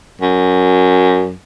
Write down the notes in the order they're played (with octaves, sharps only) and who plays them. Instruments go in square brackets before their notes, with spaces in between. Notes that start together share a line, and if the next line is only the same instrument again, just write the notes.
[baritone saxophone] F#2